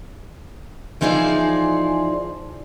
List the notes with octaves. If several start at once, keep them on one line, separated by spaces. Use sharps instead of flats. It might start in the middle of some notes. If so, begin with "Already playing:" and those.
E3 F3 D#4 G#4 C5 D5